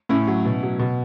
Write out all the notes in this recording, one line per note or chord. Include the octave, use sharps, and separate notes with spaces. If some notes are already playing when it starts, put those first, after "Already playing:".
A2 C#4 E4
F#3
B2
F#3
B2